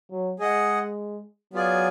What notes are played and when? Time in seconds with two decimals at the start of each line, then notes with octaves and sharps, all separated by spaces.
0.11 F#3
0.39 G#3 G#4 D#5 F#5
1.53 F#3 B3 F4 G#4 D5 G#5